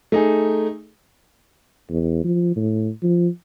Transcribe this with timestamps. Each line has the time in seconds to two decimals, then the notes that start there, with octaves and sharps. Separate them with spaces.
0.12 A3 D#4 G#4
1.89 E2
2.24 F3
2.56 A2
3.03 F3